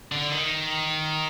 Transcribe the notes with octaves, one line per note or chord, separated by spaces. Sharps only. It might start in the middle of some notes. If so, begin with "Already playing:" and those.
D3
D#3